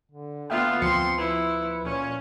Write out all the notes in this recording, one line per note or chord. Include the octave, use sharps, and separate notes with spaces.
D3
B3 F4 E5 F5 G5
D2 F3 C4 C6 C#7
E4 B4
A#2 C#4